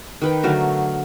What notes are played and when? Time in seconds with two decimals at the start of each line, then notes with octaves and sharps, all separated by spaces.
0.22 D#3 B4 G5
0.43 D3 F#3 A3 A#4